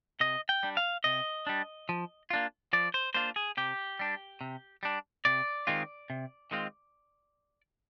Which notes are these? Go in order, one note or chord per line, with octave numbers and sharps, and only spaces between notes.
C3 D#5
G5
G3 D4
F5
C3 D#5
G3 D4
F3
A#3 D4 F4
F3 D5
C5
A#3 D4 F4 C5
G#4
C3 G4
G3 D4
C3
G3 D4
C3 D5
D#3 G#3 C4 F4
C3
D#3 G#3 C4 F4